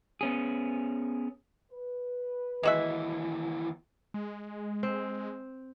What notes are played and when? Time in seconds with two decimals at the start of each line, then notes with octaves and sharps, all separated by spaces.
0.21 B3 C#4 G#4
1.72 B4
2.63 D#2 E3 G#3 F#4 E5
4.14 G#3
4.83 C4